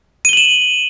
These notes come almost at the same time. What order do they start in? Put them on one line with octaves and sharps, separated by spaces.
D#7 G7 F#7 E7